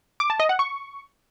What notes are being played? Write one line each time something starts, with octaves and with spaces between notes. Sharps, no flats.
D6
A5
D#5
F#5
C#6